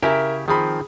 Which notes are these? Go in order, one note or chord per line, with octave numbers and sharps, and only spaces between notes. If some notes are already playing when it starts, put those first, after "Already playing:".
C#3 E4 G4 A#4 E5 G#5
D#3 F3 C4 G#4 B5